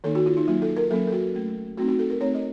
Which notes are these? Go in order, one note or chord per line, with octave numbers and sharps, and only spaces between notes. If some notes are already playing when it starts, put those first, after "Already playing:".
D#3 A#3 D#4 A4
F#4
F4
D#4
F#3 A#3 D#4 F4
A4
A#4
F#3 A#3 C#4 A4
A4
F#4
A3 C#4
A3 C4 D#4 F#4
F#4
A4
A#4
A3 C4 D#4 C#5
D#5